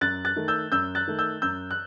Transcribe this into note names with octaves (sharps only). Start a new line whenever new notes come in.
F#2 F#6 A6
F#6 A6
D#3 A3
E6 G6
F#2 E6 G6
F#6 A6
D#3 A3
E6 G6
F#2 E6 G6
F#6